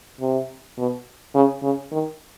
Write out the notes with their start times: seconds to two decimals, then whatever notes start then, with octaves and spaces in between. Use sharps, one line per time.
0.21 C3
0.78 B2
1.34 C#3
1.62 C#3
1.92 D#3